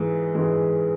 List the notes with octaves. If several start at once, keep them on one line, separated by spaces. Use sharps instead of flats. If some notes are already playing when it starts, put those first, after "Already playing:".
Already playing: G#2 E3 G#3
G#2 E3 G#3